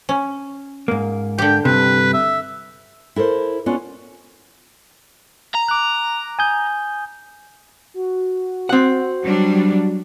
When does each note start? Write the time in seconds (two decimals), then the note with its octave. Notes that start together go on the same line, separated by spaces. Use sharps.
0.09 C#4
0.88 G#2 A#3
1.38 D3 G4 G5
1.65 G2 C3 B4
2.14 E5
3.16 E4 A4 A#4 C5
3.66 B3 C#4 D4 F4
5.54 A#5
5.69 D6 F#6
6.39 G#5 D#6 G6
7.94 F#4
8.69 C4 F#5
9.23 F#3 G3 D4